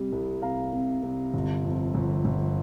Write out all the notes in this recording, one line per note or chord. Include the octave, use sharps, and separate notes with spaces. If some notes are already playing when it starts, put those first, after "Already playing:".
Already playing: C3 G3
C2
C3 F5 A#5
C3
C3
G1
F2
G1
G1